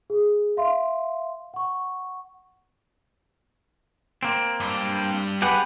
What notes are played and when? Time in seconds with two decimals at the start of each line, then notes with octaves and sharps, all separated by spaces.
0.10 G#4
0.57 E5 F5 C6
1.54 F#5 C#6
4.23 A#3 C4
4.60 G2 G3
5.42 B3 G4 G#4 B4 F#5